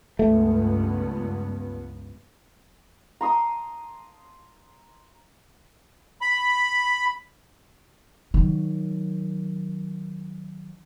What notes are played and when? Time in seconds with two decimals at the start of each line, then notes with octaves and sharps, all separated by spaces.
0.19 C#2 G2 A3 B3
3.21 A#5 C6 D#6
6.21 B5
8.34 D#3 F#3